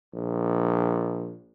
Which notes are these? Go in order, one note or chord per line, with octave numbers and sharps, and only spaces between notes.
A#1